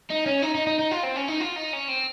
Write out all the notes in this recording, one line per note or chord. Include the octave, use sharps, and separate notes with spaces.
D#4
C#4
D#4
D#4
D#4
D#4
F4
C4
C#4
D#4
F4
D#4
C#4
C4